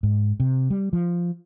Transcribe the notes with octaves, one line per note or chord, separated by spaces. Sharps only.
G#2
C3
G3
F3